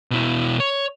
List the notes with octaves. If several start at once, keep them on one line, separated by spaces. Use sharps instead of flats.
B2 E4
C#5